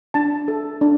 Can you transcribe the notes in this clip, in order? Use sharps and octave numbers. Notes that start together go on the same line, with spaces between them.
D4 A5
A4
D4